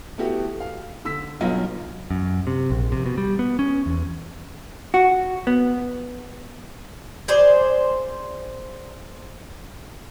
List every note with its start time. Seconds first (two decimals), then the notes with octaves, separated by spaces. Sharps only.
0.18 A3 B3 E4 F#4 G4
0.60 F5
1.05 D3 E6 B6
1.41 B1 G2 B2 F#3 F4
2.11 F#2
2.47 C3
2.70 A#1
2.92 C3
3.06 B2
3.18 G3
3.39 B3
3.59 C#4
3.86 E2
4.94 F#4
5.47 B3
7.28 G#4 C5 D5